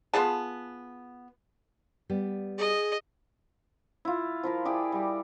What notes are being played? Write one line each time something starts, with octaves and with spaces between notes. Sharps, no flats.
B3 F4 G#4 A5
G3 B3
G#4 D#5
E4 F4
F3 E4 A#4
E4 G4 G#4 D5
G3 G4